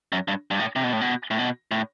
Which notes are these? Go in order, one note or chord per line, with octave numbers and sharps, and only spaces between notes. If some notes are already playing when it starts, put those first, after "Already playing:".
F#2
G2
G2
A2
C3
B2
A2
B2
A2
B2
A2